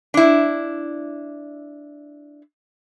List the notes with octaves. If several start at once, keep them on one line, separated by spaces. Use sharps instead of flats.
D4 E4